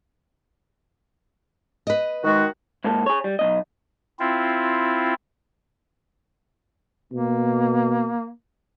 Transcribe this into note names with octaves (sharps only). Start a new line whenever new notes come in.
B4 D#5
D#3 G#3 F#4
G#2 A#3 A4
G#4 C#5
G3
B1 G#2 D#5
C4 E4 F4
B2 A#3